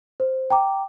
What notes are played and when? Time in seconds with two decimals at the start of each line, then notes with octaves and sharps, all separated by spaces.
0.20 C5
0.50 G5 A#5 D6